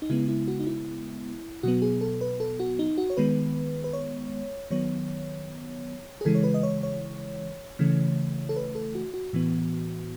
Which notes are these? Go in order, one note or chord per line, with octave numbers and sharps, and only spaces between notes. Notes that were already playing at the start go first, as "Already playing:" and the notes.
D#4
C#3 G#3 B3 E4
E4
F#4
D#4
E4
B2 F#3 B3 F#4
G#4
A4
B4
A4
F#4
D#4
F#4
C#5
D#3 G#3 B3 B4
B4
C#5
D#3 F#3 B3 C#5
G#4
C#3 E3 G#3 A4
C#5
B4
D#5
C#5
C#5
C#3 E3 A3
A4
B4
A4
F#4
F#4
A2 E3 B3